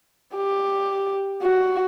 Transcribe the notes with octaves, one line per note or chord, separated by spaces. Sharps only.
G4
F#4